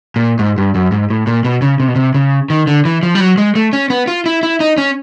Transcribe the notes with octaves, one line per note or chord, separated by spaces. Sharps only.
A#2
G#2
G2
F#2
G#2
A2
A#2
B2
C#3
C3
B2
C3
C#3
D#3
D3
E3
F3
G3
F#3
G#3
A3
C#4
B3
F4
E4
E4
D#4
C#4